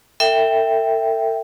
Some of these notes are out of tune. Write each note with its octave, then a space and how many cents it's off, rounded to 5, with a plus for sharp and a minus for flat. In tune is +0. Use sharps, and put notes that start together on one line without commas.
A4 +45 E5 +0 G5 +0